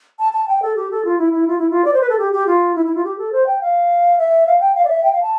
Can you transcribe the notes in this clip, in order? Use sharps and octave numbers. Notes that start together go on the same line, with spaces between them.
A5
A5
G5
A4
G4
A4
F4
E4
E4
F4
E4
F4
D5
C5
B4
A4
G4
G4
F4
E4
E4
F4
G4
A4
C5
G5
F5
E5
F5
G5
F5
D5
E5
G5
F5
A5